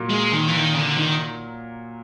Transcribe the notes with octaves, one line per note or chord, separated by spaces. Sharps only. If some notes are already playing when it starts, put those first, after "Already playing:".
Already playing: A#2 F#3 A#3
G#3
D#3
E3
D#3
C#3
D3
D#3